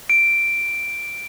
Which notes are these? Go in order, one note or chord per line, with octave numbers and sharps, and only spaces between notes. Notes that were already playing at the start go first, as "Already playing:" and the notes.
D7